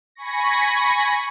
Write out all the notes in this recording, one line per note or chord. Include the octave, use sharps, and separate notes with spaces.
G#5 B5 C#6 A#6